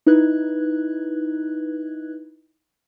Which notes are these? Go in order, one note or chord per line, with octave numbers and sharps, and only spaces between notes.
D#4 E4 B4 F#6 G#6